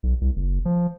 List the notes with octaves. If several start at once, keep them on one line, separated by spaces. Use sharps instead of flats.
B1
C2
F#1
F3